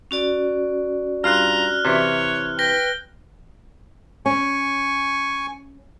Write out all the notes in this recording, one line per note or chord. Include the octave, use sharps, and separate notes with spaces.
C#4 F#4 D5
G2 F4 A#5 F6 F#6
C3 E3 E4 C#5
B4 G5 A#6 G7
C#4 G#5 C#6